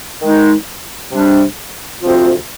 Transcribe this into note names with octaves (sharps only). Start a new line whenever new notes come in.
D#3 G#3 D#4
C3 G3 D4
D2 C3 F3 C4 F4